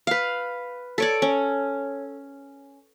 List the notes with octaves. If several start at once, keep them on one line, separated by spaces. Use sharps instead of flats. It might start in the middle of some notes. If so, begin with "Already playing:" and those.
B4 F5
A4 C#5 D5
C#4